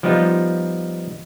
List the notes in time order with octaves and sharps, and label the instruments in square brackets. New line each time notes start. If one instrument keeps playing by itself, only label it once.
[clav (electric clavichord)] F3 G3 B3 D#4 F4